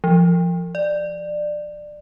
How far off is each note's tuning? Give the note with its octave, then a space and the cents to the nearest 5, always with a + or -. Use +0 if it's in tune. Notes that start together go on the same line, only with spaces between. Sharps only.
F3 -25
D5 +20